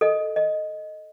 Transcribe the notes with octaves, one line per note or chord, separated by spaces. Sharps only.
A4 D#5
D#5